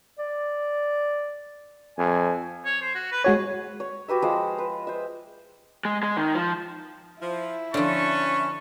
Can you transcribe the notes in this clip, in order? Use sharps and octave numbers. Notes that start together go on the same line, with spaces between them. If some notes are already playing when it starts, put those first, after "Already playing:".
D5
F2 G#5
C#5
C5
F#4
B4
G#3 F#4 C#5 G#5
C#5
F#4 G4 B4 E5
F3 G#3 C5 F5
B4
C5 E5
G#3
G#3
D#3
F3
F3 E4
D3 F3 C#4 B4 A5 C#6